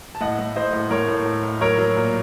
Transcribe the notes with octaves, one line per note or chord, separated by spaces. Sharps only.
A5
A2 D#5 F#5
A2
A2 C5 D#5
A2
A2 A#4 C#5
A2
A2
A2
F#3 A#4 C#5
F#3
A#2